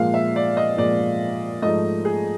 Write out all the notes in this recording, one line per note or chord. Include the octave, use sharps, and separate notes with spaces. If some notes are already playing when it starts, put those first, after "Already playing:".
Already playing: A#2 F3 G#3 F5
E5
D5
D#5
A#2 F3 G#3 D5
G#2 F3 A3 D#5
G#4